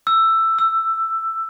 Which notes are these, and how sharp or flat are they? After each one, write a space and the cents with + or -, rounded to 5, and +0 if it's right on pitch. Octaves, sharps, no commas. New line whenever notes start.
E6 +10
E6 +20